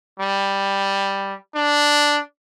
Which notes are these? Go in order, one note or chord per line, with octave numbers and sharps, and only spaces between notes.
G3
D4